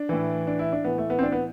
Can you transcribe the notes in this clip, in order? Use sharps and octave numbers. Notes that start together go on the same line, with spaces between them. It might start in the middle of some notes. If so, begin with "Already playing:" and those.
Already playing: D4
A2 E3
D4
E4
D4
A2 E3 B3
A3
B3
C4
D4
B3